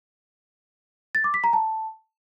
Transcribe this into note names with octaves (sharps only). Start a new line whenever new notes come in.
A6
D6
B6
A#5
A5